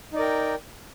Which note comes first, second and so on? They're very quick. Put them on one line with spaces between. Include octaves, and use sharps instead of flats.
D#4 D5 A#4 G5